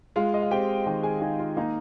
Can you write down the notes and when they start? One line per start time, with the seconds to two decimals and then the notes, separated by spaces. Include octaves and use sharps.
0.16 G#3 F4 F5
0.34 D#5
0.42 F5
0.51 C4 G4 G5
0.86 D#3 G4 G5
1.03 G#4 G#5
1.21 D#4 G#4 G#5
1.39 F4 F5
1.57 A#3 D#4 D#5